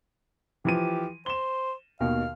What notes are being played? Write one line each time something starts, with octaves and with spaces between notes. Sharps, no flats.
E3 F3 G4 D#7
C5 E7 G7
D#2 B2 D#3 F5